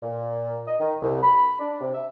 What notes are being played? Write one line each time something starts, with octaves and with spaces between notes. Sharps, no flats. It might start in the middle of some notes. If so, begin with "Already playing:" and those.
A#2
D#5
D#3
C2
B5
D4
C3
E5